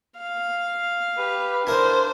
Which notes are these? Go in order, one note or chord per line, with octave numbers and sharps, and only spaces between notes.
F5
G4 B4
D4 E4 A#4 C5